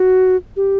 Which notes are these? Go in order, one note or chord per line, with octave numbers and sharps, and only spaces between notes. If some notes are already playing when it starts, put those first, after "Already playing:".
Already playing: F#4
G4